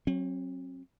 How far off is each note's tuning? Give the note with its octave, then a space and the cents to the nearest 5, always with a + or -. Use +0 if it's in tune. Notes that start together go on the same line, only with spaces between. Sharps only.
F#3 +0 C4 +40